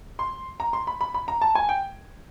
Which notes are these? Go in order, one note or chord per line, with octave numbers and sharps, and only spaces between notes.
C6
A#5
C6
B5
B5
B5
A#5
A5
G#5
G5